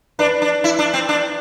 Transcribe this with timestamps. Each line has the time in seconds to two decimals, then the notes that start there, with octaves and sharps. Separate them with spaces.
0.19 D4 B4 D5
0.42 D4
0.64 E4
0.79 D4
0.94 C4
1.09 D4